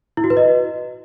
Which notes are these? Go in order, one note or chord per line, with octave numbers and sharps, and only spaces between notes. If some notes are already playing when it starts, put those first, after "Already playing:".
E4
F#4
B4
D#5